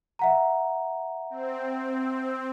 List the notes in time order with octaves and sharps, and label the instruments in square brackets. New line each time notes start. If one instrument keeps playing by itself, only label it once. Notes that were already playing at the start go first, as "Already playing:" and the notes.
[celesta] E5 F#5 A#5
[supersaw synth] C4